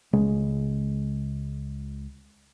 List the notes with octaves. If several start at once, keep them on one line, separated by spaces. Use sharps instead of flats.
C#2 C#3 G#3